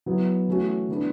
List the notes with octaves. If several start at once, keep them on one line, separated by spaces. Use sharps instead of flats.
F#3 B3 E4
E3 A3 C#4 F#4
E3 B3 D4